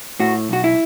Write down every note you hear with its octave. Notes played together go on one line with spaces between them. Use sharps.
A2 F#4
B1 F#4
E4